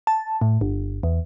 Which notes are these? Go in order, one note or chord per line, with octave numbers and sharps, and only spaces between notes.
A5
A2
G1
E2